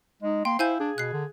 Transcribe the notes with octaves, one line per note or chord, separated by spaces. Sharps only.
G#3 D#4
A#3 G5 C6
E4 C5 F5 G#5 G6
D4 G#4
B2 F#6 C7
D3